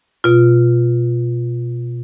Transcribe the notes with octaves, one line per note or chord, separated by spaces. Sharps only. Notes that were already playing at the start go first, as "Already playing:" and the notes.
B2 F4